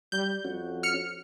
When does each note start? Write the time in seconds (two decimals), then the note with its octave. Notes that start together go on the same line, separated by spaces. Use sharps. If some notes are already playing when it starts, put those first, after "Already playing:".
0.12 G3 G6
0.45 F2 C#4 F#4
0.83 F6 C#7